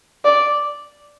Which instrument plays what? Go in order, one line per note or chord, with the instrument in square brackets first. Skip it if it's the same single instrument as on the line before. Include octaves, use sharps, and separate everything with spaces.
[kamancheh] D5